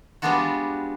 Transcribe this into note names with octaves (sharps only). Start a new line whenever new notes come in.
G3 G#3 B3 D4 F4 F#4